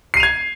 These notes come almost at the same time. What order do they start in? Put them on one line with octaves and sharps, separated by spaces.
C7 D#7 F7 G#6